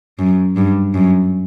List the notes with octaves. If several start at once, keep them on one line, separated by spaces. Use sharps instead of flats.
F#2
G2
F#2